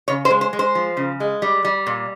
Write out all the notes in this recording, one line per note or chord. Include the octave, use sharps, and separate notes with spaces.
C#3 C#5
C5
G#3
C5
G#3
C5
F3
C#3
G#3
G3
G3
A#2